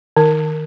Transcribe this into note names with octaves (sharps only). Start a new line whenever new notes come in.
D#3